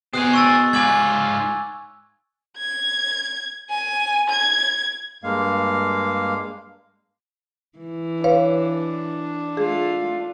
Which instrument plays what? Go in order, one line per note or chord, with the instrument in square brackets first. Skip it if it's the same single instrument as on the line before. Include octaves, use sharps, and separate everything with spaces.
[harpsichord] B2 [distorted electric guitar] C4 G#4 [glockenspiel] D#6 F#6
[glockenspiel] C#6 E6 A6
[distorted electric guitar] G#2 F4 [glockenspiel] G#5 D6 G#6 [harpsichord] B5
[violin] G#6
G#5
G#6
[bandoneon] G2 G#3 A#3 F5
[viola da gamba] E3
[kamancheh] D4 [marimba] B4 C#5 F5
[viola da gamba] A3 F4 [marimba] G#4